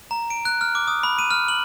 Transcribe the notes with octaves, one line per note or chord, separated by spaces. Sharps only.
A#5
D7
F#6
F6
D6
D#6
B5
D#7
F6
F#7